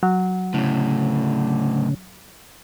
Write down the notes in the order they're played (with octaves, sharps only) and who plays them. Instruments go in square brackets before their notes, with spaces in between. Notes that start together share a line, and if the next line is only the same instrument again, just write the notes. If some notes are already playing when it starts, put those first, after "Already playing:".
[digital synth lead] F#3
[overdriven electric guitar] D2 A2 [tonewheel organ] C#3